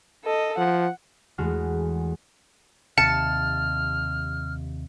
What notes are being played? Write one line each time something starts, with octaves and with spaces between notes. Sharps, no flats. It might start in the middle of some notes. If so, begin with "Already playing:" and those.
A4 D#5
F3 F#5
E2 G#3 A3 F#4 F6
D#2 C3 A5 F6 C#7